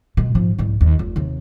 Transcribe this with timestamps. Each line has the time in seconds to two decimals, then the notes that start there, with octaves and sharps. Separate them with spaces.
0.17 B2 G#3
0.35 G#2 F3
0.58 C2 G#2
0.81 D#2
0.99 F1
1.16 D#2 C3